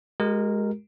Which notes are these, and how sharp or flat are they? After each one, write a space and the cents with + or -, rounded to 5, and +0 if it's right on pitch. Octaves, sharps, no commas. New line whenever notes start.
G#3 +5 G4 -45 A#4 -5